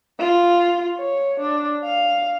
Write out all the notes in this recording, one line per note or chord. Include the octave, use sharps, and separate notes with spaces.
F4
C#5
D4
F5